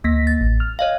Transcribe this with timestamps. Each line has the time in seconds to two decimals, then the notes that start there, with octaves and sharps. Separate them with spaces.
0.04 D2 A#3 A#6 B6
0.27 A6
0.41 A1
0.60 F6
0.79 C#5 D#5 F5